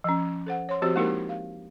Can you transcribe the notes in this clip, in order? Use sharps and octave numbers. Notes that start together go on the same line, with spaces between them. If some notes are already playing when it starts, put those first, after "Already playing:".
F3 C#4
A4 C5 F#5
C#5 C6
F3 C4 F#4 G4 C5
G#3 A#3 D#4 E4 G4 A#4
F5